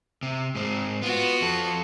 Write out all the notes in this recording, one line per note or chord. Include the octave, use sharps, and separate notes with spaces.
C3
G#2 C4
B3 F4 F#4
F2 A4